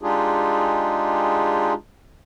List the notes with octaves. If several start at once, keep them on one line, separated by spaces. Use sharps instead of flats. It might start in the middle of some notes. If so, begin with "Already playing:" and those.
G#3 D4 D#4 F4 G4 G#4